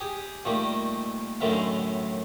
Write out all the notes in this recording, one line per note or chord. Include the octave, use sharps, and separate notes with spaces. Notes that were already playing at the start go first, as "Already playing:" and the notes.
G4 G#4
A#2 D#3 G3 A3
F#2 A2 D3 D#3 E5 F5